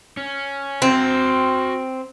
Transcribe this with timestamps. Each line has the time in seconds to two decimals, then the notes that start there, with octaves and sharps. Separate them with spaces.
0.17 C#4
0.82 C4 F#4 E5